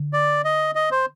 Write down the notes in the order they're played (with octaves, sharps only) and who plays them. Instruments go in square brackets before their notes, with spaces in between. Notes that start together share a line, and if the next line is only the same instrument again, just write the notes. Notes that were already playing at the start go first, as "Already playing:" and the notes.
Already playing: [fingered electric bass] D3
[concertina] D5
D#5
D#5
C5